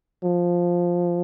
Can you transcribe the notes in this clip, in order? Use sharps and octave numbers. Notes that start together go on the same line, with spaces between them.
F3